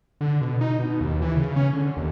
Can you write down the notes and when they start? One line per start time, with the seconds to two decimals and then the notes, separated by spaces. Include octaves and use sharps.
0.21 D3
0.41 B2
0.61 D#4
0.79 B2
1.01 D#2
1.22 E3
1.36 C#3
1.56 C#4
1.73 D3
1.97 D#2